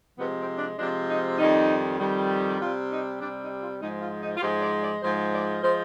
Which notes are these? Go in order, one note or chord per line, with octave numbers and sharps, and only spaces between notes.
C3 F3 G#3 B3
C4
D4
C3 F3 G#3 D4
D#4
F2 D#3 G3 D#4
F2 D#3 G3
C3 G3 F4
D#4
C3 G3 D4
D#4
F4
G#2 F3 G#3 D#4
F4
D#4
F4
G#2 F3 G#3 G4
D5
D5
G#2 F3 G#3 C5
D5
F3 G#3 C5